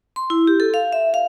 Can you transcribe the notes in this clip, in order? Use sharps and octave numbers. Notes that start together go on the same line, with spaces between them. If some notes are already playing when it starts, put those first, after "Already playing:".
C6
E4
G4
A4
F5
E5
F5